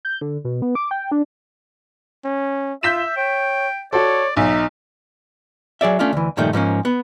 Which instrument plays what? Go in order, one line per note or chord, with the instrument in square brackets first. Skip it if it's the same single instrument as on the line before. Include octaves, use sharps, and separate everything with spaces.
[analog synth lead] G6
D3
B2
B3
D6
G5
D4
[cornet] C#4
[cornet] F4 [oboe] E5 [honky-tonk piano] G6 B6 E7
[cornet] C#5 [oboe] G5
[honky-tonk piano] F#4 A4 [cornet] C#5 [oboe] D5
[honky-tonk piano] B1 [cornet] D#4 [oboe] E5
[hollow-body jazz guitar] F#3 G#4 D5 E5
A3 C#4 D4 F4
D2 E3
G2 A#2 D#3 F3 A3
G#2 F3 A#3 C#4
B3